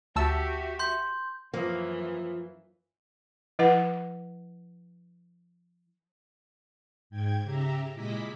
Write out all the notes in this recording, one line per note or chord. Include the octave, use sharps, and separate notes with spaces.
D2 F#4 G4 E5 A5 E6
C6 G6
F#2 E3 F3 A#3
F3 E4 B4 F#5
G#2 G5 G#6
C#3 G4 E5 A#5
A#2 G#3 E4 D#5 D6 B6